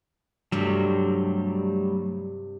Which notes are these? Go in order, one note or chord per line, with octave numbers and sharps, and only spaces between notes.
G2 C3 F#3 G3 A3